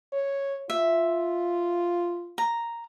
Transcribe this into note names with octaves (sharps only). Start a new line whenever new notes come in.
C#5
F4 E5
A#5